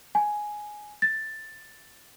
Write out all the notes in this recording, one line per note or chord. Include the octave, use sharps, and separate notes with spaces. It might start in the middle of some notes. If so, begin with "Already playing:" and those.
G#5
A6